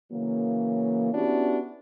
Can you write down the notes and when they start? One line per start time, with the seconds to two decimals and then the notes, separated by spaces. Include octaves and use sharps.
0.12 C#3 E3 F#3 A#3
1.14 B3 C#4 D4 E4 F#4 G4